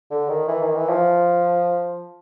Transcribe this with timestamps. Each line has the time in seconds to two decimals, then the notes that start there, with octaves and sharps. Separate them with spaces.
0.11 D3
0.29 D#3
0.48 E3
0.62 D#3
0.75 E3
0.89 F3